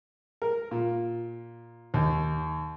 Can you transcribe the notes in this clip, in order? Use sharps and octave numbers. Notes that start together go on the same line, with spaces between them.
A#4
A#2
D#2